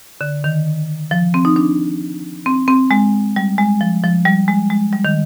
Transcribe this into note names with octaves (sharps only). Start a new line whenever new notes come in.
D3
D#3
F3
C4
D#4
D4
C4
C4
G#3
G3
G#3
F3
F3
G3
G#3
G#3
G3
D#3